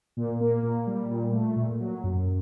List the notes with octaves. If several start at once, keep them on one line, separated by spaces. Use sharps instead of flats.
A#2
A#3
A#2
G3
A#2
A3
A#2
F#3
F#2